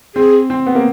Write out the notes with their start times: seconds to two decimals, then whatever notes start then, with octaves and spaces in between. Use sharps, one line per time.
0.15 C4 G#4
0.50 C4
0.67 B3
0.75 A#3